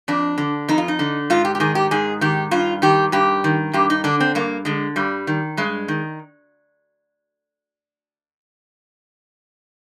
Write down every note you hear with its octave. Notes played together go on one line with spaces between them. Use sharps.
F2 D4
D3
F2 D#4
F4
D#4
D3
G#2 F4
G4
G4
D#3 G#4
G4
G#2 G#4
D#3 G4
G2 F4
D#3 G4
G2 G4
D#3
G2 G4
D#4
D3 D4
C4
G2 A#3
D3 G#3
G2 G3
D#3
G2 G#3
D#3